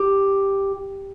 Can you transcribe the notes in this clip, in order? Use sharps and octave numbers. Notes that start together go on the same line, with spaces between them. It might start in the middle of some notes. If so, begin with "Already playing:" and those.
Already playing: G4